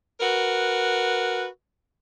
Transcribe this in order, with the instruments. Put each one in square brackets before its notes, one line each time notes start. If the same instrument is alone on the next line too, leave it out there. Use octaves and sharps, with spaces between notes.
[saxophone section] F#4 A#4 B4